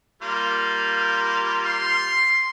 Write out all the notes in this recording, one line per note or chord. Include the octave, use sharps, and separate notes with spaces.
G3 A#3 F4
C6